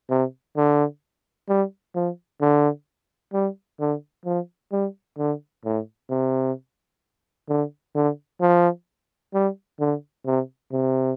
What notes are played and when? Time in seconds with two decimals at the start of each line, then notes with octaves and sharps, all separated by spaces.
0.10 C3
0.57 D3
1.49 G3
1.95 F3
2.41 D3
3.34 G3
3.80 D3
4.26 F3
4.72 G3
5.18 D3
5.65 A2
6.10 C3
7.49 D3
7.95 D3
8.41 F3
9.34 G3
9.80 D3
10.26 C3
10.72 C3